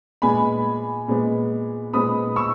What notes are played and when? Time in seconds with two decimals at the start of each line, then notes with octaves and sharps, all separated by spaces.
0.22 A#2 G#3 B3 G#5 B5
1.08 A#2 G#3 B3
1.93 A#2 G#3 B3 B5 D#6
2.36 C#6 E6